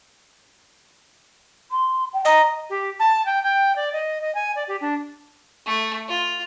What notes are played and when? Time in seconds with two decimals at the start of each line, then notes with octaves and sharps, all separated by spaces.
1.71 C6
2.13 G5
2.25 D#5 A#5
2.70 G4
2.99 A5
3.26 G5
3.43 G5
3.76 D5
3.93 D#5
4.21 D#5
4.35 G#5
4.56 D5
4.68 G4
4.81 D4
5.66 A3
6.09 F4